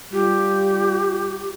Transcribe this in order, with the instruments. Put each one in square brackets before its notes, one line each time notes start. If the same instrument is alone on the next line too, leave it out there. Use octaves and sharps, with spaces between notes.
[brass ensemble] G3 F4 [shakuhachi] G4